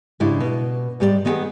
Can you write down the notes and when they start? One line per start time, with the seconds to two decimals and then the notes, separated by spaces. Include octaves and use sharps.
0.20 G#2 C#3 D4 E4 G4
0.40 B2
1.00 G#2 G3 G4 A4 D5
1.25 D#3 B3 F4 G4 G#4 F#5